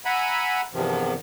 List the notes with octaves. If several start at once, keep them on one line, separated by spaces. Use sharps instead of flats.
E5 F#5 G#5 A#5 B5
E2 G2 C3 D#3 F3